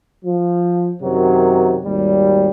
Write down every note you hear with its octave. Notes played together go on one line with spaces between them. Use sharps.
F3
F#2 C3 D#3 F#3
G#1 D#2 G3